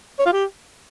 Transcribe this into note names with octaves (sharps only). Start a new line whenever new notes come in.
C#5
F4
G4